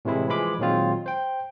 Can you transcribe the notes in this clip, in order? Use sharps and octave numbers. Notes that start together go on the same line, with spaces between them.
A2 C3 E3 G#3 E4
E3 F3 G#3 B5 D6
A#2 D#3 F#3 G#3 C4 F4
C5 G5